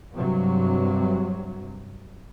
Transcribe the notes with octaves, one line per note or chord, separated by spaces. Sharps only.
G2 C3 F#3